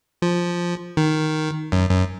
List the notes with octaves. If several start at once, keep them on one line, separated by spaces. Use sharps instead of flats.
F3
D#3
F#2
F#2